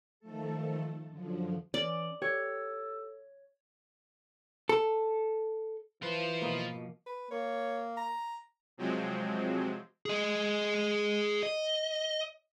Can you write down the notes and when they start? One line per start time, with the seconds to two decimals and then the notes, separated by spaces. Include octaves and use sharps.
0.20 D#3 F3 A3 A4
1.09 F#2 D3 F3
1.74 E3 C#4 D5
2.22 G4 A4 C#5
4.69 A4
6.03 E3 F4 B4 C5
6.42 B2 F3 A#3 B3 D#5
7.06 B4
7.31 A#3 C#5
7.97 A#5
8.78 C3 F3 F#3 G#3 C4
10.06 G#4 D#5
11.43 D#5